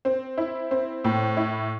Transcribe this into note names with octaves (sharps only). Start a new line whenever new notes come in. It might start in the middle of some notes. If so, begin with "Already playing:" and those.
C4
E4
C4
A2
E4